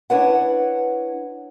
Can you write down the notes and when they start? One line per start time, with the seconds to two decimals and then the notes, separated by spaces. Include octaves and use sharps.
0.10 D4 E4 B4 C#5 F#5